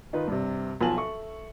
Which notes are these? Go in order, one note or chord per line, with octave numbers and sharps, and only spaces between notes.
D#3 D#4 F4 B4
G2 C3
B1 F3 F4 G#5 A5 F#7
A4 E5 C#6